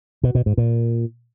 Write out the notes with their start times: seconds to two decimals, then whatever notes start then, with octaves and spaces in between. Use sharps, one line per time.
0.23 B2
0.35 B2
0.46 G#2
0.58 A#2